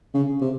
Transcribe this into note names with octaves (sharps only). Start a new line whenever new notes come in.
C#3
C3